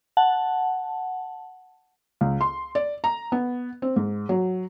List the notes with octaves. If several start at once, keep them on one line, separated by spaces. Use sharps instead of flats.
F#5 A5
C#2
C6
D5
A#5
B3
C4
G#2
F#3